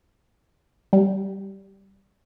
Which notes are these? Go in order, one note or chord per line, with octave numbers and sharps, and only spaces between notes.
G3